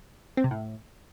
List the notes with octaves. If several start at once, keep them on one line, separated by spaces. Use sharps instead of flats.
C4
C3
A2